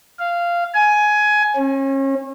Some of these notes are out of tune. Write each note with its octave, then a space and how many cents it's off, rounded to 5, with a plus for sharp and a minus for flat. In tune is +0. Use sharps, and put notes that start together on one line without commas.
F5 -10
G#5 +15
C#4 -35